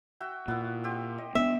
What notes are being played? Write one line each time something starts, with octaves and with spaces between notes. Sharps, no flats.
F#4 E5 G5
A#2 B3 E4
C4 G4
D#5
B3 C4 D4 E5